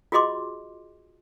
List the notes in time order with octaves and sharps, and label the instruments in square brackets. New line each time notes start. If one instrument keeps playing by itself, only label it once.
[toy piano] F4 F#4 G#4 D#5 C6 D6